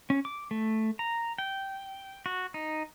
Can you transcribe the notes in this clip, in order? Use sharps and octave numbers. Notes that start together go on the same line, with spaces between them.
C#4
D6
A3
A#5
G5
F#4
D#4